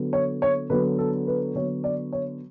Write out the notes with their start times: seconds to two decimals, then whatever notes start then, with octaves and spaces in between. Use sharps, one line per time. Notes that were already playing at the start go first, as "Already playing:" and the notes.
Already playing: D3 F#3 B3
0.13 C#5
0.42 C#5
0.70 D3 F#3 B3 B4
0.98 A4
1.27 B4
1.55 D3 F#3 B3 C#5
1.84 D5
2.13 C#5